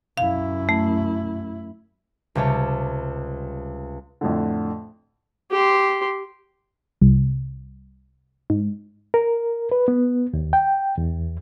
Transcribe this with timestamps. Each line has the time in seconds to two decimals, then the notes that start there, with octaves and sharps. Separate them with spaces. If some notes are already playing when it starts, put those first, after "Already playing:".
0.17 F#2 E4 F5
0.69 A3
2.35 C#2 C3 G3 C#5 A5
4.21 F2 A2 D3
5.51 G4 C6
7.02 C2
8.50 G#2
9.14 A#4
9.72 B4
9.88 B3
10.33 D#2
10.53 G5
10.98 E2